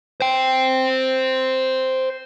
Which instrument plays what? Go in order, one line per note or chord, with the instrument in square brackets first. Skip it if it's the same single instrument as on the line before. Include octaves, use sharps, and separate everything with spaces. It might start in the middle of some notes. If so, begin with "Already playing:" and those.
[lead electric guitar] C5 G5